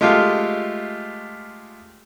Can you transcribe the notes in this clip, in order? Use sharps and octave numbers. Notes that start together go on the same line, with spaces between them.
G#3 A3 F4 G4 F5